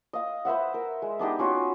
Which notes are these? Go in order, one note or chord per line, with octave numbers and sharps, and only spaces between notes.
D#5 F5
B4 C5 E5 F#5
A#4
G#3
B3 D4 D#4 G4
C#4 F4 F#4